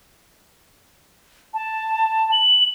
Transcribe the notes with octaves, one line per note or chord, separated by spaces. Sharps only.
A5
F#7